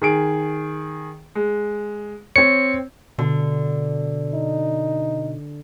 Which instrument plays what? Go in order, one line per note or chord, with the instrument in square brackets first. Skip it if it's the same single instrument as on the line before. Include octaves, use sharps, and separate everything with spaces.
[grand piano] D#3 G#4 D7
G#3
[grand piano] C4 C#5 [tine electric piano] C#7
[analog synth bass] B2 [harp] D3
[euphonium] D#4